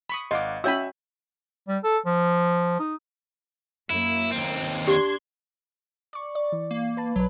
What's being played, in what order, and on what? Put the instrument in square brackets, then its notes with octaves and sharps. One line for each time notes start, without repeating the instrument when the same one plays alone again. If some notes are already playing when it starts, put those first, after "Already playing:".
[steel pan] B5 C#6 D#6
[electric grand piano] G#1 F5 F#5 [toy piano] D#5 [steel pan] C6 D6
[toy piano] C#4 C#5 E6 [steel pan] F#4 G#5 B5 [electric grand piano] E5
[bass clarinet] G3
A4
F3
D#4
[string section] F#2 A#3 [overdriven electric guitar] E4
[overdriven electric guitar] D#2 C4
[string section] D4 C6 G#6 [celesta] G4
[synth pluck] D5 C#6
D5
E3
[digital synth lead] A#3
[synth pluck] B4 A5
[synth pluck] B1 B4 [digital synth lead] F#3